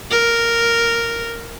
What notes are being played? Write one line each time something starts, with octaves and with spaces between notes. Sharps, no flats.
A#4